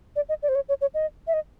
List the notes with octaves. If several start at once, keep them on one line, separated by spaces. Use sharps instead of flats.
D5
D#5
D5
C5
C#5
C#5
C#5
D#5
E5
D#5